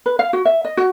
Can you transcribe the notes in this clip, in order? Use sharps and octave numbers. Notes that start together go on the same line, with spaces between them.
B4
F5
F#4
E5
D#5
F#4